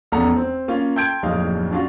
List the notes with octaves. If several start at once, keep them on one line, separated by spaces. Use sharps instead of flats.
F1 E2 B2 C#4 A4 A#5
C4
A#3 C#4 F4
G5 A5 C6 G6 G#6 D7
D1 A#1 F2 D#4 F5
C#4 D4 F4 F#4